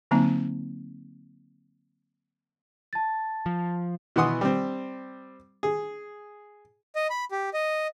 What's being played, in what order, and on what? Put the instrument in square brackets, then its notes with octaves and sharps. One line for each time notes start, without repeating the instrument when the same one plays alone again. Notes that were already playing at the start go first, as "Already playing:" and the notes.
[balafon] D3 F#3 A#3 C4 D#4 G#5
[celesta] A5 A6
[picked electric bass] F3
[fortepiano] B2 E3 B3 F#5 C6 D#6
G3 C4
G#4
[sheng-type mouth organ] D#5
B5
G4
D#5